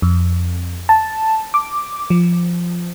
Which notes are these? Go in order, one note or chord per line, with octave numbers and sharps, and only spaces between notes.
F2
A5
D6
F3